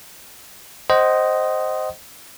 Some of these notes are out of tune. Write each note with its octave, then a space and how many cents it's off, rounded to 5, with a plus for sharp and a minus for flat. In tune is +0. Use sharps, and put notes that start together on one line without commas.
C5 +0 D#5 +0 F#5 +40